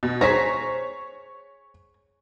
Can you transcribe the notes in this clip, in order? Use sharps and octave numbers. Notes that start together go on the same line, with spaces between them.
B2
G#4 C5 C#5 A#5 B6